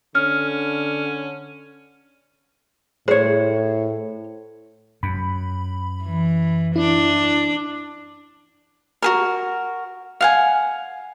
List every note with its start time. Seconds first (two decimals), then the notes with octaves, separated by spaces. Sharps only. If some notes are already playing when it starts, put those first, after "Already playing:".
0.15 D3 C#4 F6
3.08 A2 G#4 C5 C#5
5.03 F#2 B5
6.04 E3
6.76 D4 E4
9.02 F#4 G#4 A#4
10.21 F5 F#5 G#5